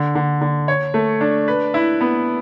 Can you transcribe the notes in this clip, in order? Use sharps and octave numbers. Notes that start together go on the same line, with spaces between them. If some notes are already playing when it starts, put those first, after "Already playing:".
Already playing: D3
D3
D3
C#5
A3
D4
B4
E4
B3